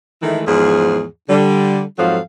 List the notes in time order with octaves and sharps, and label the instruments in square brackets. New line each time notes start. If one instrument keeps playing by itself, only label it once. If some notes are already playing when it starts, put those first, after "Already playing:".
[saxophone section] D#3 E3 G#3 A3
E2 G#2 F3 G#4
D3 G3
F2 G#2 F3 F#3 A4 F5